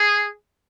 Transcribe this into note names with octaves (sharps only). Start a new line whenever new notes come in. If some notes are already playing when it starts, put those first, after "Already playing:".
Already playing: G#4